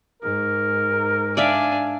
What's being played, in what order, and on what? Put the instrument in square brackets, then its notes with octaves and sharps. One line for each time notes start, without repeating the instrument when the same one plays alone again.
[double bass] G#2 [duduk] A#4
[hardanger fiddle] D4 G#5 [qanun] D5 E5 F5